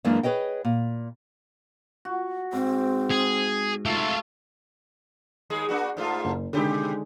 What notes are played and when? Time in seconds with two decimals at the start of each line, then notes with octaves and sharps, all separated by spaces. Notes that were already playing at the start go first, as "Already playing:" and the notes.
0.05 F#2 E3 G#3 A#3 C#4 D4
0.23 G#4 B4 C#5 D#5 G5
0.65 A#2
2.05 F#4
2.53 G#2 C4
3.11 G#4
3.85 A3 F4 E5
5.50 D#2 G#3 G#4
5.69 A#3 D4 F#4
5.97 G#2 A3 F4
6.25 F#1
6.53 B2 D3 D#3 G#3 G4